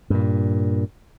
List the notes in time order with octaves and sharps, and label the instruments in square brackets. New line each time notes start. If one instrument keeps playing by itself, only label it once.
[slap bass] G2 A#2